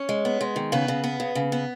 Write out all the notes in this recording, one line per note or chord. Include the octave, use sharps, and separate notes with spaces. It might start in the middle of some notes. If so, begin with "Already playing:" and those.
Already playing: C#4 C#5
G#3
B3
G#3
D#3
C#3 B3 B4
C#3
B3
C#3
C#3
B3